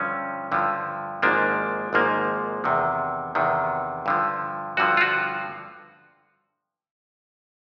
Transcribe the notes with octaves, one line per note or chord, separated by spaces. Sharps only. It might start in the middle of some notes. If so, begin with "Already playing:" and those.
Already playing: G2 D3 F3 C#4
G2 D3 F3
G#1 G#2 F3 A#3 D4
G#1 G#2 F3 A#3
E2 C3 D#3
E2 C3 D#3
G2 D3 F3
G2 D3 F3 F#4
F4
F#4